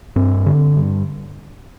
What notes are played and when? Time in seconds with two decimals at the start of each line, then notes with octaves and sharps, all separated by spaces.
0.16 G2 C4
0.46 D3
0.76 G2